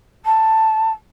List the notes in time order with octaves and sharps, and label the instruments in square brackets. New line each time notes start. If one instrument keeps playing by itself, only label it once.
[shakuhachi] A5